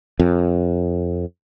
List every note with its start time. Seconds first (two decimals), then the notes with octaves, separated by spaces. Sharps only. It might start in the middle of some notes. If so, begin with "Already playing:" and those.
0.20 F2